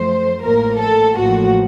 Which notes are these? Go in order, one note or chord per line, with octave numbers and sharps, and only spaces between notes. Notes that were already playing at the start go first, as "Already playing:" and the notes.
Already playing: F#2 F3 A3 C5
A1 A2 F3 A#3 A#4
A4
A1 A2 F3 A#3 F#4